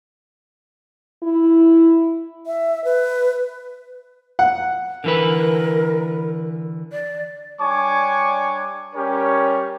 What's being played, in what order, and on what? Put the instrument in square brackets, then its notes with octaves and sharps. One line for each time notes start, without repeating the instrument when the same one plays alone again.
[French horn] E4
[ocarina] E5
B4
[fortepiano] F#5
[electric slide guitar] D3 E3 B4 [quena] A#4
[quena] D5
[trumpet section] G3 D4 C#5 G#5 C#6 D6
G3 C#4 G4 A#4 C#5